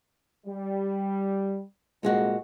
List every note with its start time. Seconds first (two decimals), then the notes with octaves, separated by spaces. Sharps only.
0.46 G3
2.03 C2 F2 A#2 G#3 F#4